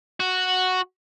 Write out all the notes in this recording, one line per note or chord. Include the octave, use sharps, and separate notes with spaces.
F#4